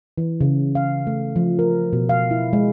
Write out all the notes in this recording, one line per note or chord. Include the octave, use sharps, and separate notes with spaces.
E3
C#3
F5
A3
F3
A#4
B2
F5
E4
G#3